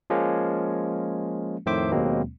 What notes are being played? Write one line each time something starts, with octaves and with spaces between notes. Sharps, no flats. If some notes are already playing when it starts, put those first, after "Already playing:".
F3 G#3 A#3 C#4
F2 A2 D#3 C5 E5 D6
D#2 B2 F#3 G#3 A#3 C4